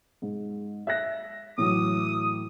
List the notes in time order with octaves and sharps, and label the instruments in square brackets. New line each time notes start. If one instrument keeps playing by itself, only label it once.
[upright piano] G#2
E5 F#6 A#6
[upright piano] A2 E3 F#3 [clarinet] D#6